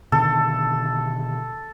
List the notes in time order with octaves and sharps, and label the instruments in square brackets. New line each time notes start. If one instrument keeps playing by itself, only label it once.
[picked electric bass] B2 D3 D#3 [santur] A4